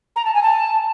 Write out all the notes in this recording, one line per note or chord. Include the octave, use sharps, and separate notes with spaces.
A#5
A5
G#5
A5